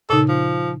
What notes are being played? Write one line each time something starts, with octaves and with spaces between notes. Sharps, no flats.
A#2 C#3 D#4 A4
F3